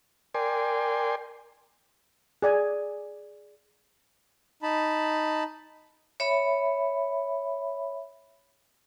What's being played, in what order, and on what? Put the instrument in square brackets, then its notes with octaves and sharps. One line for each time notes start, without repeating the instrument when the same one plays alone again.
[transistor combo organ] A#4 D5 G5 G#5 C6
[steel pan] G#4 D5 G#5
[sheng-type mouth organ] D#4 A5 B5
[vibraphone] C#5 E5 B5